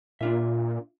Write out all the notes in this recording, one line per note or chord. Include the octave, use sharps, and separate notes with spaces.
A#2 D4 F4 E5